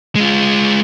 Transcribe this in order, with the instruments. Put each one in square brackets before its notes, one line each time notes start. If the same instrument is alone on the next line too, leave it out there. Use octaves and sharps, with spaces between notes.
[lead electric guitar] G#3 F4